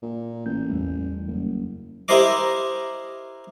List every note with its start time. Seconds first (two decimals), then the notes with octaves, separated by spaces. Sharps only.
0.02 A#2
0.46 A1 G6
0.70 E2 G3 A3
1.27 F#1
2.08 E4 G4 A#4 C5 D#5 D6